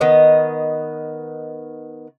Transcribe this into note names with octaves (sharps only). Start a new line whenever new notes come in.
D#3 B3 D#5